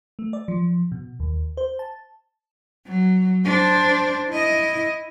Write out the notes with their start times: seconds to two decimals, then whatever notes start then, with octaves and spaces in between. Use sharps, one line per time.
0.19 A3
0.33 D5
0.48 F3
0.92 B2
1.20 D#2
1.57 C5
1.79 A5
2.87 F#3
3.45 D4 C5
4.30 E4 D#5